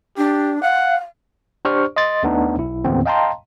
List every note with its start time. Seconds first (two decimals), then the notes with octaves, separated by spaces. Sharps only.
0.17 D4 G4
0.62 F5 F#5
1.65 D4 G4 C5 D5 C#6 F6
1.96 D#5 C6 A6
2.23 D#2 A3 B3 D4 D#4
2.57 B1 E4
2.85 D#2 A2 D3 E3 B3 C4
3.05 D#5 F5 G5 A5 A#5 C6